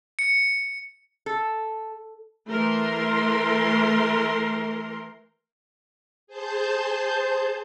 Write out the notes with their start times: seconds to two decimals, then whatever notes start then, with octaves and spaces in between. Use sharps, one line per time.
0.19 C#7
1.26 A4
2.49 E3 A3 A#4 C6
6.27 G#4 C5 A5 G6